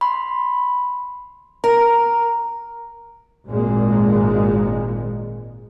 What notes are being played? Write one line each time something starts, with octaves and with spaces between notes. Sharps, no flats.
B5 C6
A#4 A#5
G#1 A#2 G#3